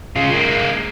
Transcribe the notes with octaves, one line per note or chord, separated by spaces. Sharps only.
C#3 F4
G#3 A#3